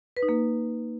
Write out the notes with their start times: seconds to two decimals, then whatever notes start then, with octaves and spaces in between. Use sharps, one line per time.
0.17 B4
0.23 D#4
0.29 A#3